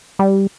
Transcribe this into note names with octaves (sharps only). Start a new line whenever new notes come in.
G3